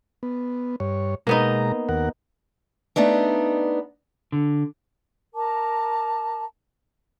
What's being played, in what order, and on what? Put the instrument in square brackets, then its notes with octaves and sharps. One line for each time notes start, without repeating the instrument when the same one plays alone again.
[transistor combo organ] B3
G2 C#5
[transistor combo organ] B2 G#3 A#5 [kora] A#3 B3 D#4
[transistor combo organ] D#2 A#4 F#5
[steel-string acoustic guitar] A3 B3 D4 D#4
[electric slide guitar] D3
[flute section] A#4 A5 A#5 D6